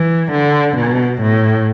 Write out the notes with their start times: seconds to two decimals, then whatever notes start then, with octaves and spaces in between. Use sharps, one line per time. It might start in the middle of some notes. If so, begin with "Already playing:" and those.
Already playing: E3
0.32 D3
0.77 B2
1.22 A2